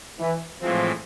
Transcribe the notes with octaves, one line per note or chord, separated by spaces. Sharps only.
E3
A2 E3 F3 G#3 C4